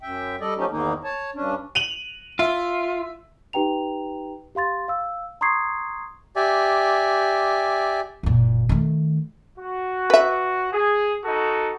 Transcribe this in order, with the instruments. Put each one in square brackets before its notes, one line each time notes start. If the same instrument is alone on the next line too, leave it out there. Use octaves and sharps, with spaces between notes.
[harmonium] F#2 E5 G5
G3 A4 D5 D#5
F3 F#3 A3 C#4 D#4 G4
E2 G#2 D#3 A#3 D#4
C#5 A5
G2 C#4 D4
[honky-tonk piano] D#7 F7 F#7
[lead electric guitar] F4 [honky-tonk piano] E5
[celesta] D#4 G4 B4 G5 A#5 F7
G4 F5 C6 A6
F5 E6
A#5 C6 C#6 D#6 G#6 C7
[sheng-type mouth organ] G4 D5 E5 G#5
[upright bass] F#1 A#2
D#3 A3
[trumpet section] F#4
[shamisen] B4 E5
[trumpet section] G#4
D#4 F#4 A4